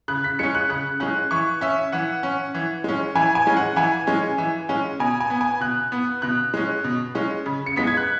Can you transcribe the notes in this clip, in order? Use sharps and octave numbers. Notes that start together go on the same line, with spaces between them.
C#3 F#6
B6
G#3 C#4 C#7
F#6
C#3 F#6
G#3 C#4 F#6
E3 C#6
C#4 E5
E3 F#5
C#4
E3
G#3 C#4
E3 G#5
G#5
G#3 C#4
F#5
E3 G#5
G#3 C#4
E3
G#3 C#4
B2 G#5
G#5
B3
G#5
B2 F#6
B3
B2 F#6
G#3 C#4
B2
G#3 C#4
C#3
C#7
G#3 B3 B6
G#6
F#6